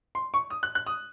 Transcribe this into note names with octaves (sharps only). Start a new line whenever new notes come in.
C6
C#6
D#6
F#6
F#6
D#6